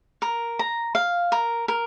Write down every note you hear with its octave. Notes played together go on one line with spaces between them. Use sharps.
A#4
A#5
F5
A#4
A#4